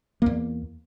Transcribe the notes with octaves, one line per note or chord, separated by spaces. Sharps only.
E2 A#3